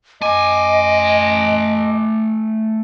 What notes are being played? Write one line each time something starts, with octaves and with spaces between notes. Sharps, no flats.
F#2 A3 D#5 G#5 C6 D6